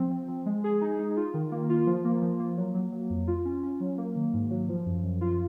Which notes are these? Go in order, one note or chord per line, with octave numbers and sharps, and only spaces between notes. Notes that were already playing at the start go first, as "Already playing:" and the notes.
Already playing: F3 C4
C4
F3
G#3
G#4
D#4
D#4
F4
D#3
A#3
F4
F3
A#3
F3
A#3
F#3
F#3
F#3
F2
F4
C#4
C#4
F#3
A#3
D#3
G#2
F#3
F3
F#2
F#2
F4